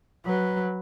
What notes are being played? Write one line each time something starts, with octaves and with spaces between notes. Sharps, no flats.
F#3 B4